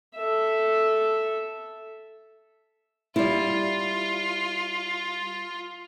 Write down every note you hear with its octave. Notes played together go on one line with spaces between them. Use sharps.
A4 E5
G3 E4 F4